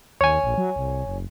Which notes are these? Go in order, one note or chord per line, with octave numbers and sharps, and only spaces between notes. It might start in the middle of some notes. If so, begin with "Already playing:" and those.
D#2 C#5 G#5
A#1
F#3
C2
F#1